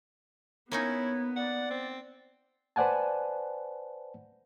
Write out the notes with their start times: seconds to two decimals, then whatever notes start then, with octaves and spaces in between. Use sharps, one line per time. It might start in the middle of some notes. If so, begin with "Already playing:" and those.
0.72 A#3 B3 C#4 D#4 E4 C#5
1.36 D5 F#5
1.70 C4
2.76 B4 C5 D5 F#5 G#5 A5